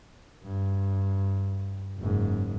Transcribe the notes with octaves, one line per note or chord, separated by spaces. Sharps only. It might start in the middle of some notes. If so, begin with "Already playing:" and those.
G2
F#1 G#2